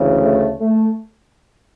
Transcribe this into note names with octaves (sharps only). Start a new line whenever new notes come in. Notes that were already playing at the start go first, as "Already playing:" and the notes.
Already playing: D2 C#3 E3
A3
A3